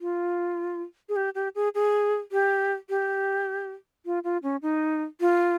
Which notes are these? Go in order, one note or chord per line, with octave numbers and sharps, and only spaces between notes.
F4
G#4
G4
G4
G#4
G#4
G4
G4
F4
F4
C#4
D#4
F4